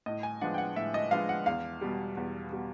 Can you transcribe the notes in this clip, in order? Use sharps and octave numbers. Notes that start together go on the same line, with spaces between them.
A2 D#5
G#5
F3 G#3 B3 D4 F#5
G5
F#5
A2 E5
D#5
F3 G#3 B3 D4 F5
F#5
E2 F5
B2 G3
E2
B2 G3